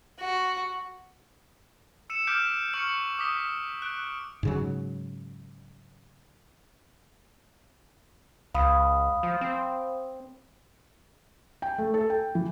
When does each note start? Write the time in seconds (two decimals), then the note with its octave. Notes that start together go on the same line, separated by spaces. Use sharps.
0.20 F#4
2.10 E6 C#7 D#7 E7
2.27 D6 F6 G6 B6 D7 E7
2.73 C#6 F6 C#7 F#7
3.19 D6 D#6 B6 G7
3.82 F#6 D7
4.43 G#2 C#3 F#3
8.55 C#2 F5 B5 D#6
9.23 F3
9.41 C4
11.62 G5
11.78 A3
11.94 A4
12.10 G5
12.35 E3